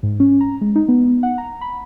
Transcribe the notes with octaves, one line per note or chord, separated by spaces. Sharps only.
G#2
C#4
A#5
G#3
D#4
B3
F#5
A#5
B5